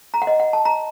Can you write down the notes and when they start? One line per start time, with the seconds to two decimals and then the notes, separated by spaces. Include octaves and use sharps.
0.14 A#5
0.22 F#5
0.27 D#5
0.40 F#5
0.53 A5
0.65 A#5